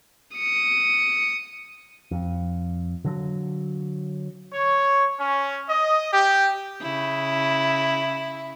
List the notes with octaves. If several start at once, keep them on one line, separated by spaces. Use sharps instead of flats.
D#6 C#7
F2
D3 F#3
C#5
C#4
D#5
G4
C#3 E4